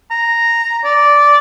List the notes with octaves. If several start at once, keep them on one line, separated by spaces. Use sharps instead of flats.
A#5
D5